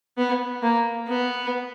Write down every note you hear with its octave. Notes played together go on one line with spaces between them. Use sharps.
B3
A#3
B3